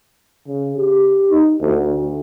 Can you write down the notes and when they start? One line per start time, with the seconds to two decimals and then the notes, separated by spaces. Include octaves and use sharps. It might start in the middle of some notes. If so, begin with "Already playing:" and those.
0.47 C#3
0.78 G4
1.31 D#4
1.61 D2